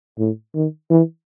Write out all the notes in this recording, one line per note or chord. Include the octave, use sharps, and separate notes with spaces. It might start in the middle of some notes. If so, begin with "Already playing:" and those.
A2
D#3
E3